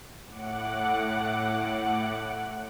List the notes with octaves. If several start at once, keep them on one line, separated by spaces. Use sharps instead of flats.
A2 F#5 D6 F#6